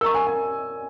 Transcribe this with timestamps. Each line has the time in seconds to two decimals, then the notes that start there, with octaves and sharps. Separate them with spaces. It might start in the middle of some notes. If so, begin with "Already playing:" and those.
0.01 A#4 D#5 A#5 C#6 E6
0.14 G#5
0.27 G#5